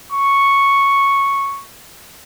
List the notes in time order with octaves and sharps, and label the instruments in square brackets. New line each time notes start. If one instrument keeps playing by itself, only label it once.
[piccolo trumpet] C#6